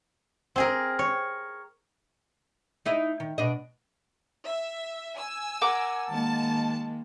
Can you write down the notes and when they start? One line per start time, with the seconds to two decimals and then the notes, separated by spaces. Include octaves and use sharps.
0.56 C4 G#4 A#4
0.99 C#5
2.86 D#4 E4 D#5
3.20 D#3
3.38 B2 D4 D#5
4.46 E5
5.18 G#5 E6
5.61 A#4 F#5 D6
6.09 D#3 G#3 A#3 A5